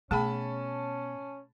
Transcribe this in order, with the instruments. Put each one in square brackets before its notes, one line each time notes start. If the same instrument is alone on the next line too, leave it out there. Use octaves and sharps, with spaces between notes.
[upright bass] B2 [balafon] A3 G#4 G5 [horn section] C#4 [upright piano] A5 B5